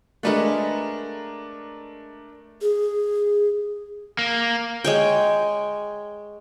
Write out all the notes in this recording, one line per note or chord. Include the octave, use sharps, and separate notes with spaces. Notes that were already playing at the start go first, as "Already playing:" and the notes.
G#3 A3 D4 A#4 B4 F#5
G#4
A#3
G#3 C#5 G5